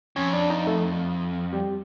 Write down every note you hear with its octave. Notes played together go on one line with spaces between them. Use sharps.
F2 C#4 C#5
D4 D5
D#4 D#5
A3 A4
G3 G4